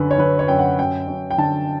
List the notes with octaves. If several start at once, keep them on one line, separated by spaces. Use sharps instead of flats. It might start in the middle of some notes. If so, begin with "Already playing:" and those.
Already playing: F#2 D3 B4
C#5
D3 B4
C#5
F#2 G5
F#5
F#2 G5
F#2
G5
D3 A5